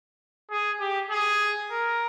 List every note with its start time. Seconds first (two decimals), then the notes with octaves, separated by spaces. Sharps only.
0.51 G#4
0.80 G4
1.11 G#4
1.72 A#4